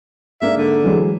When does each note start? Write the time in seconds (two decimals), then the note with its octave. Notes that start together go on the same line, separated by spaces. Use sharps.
0.41 G#2 A#3 D4 E5
0.57 D3
0.84 E3 F#3 G#3